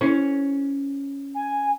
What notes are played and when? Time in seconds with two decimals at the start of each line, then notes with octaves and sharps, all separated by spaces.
0.01 C#4 E4
1.35 G#5